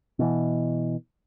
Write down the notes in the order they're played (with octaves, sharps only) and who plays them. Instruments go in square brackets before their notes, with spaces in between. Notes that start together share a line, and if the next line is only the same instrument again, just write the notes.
[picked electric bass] B2 E3